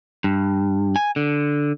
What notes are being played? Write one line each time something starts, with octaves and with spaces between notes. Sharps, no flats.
G2
G#5
D3